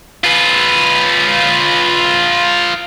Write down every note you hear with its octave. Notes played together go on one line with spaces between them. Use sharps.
F4 B4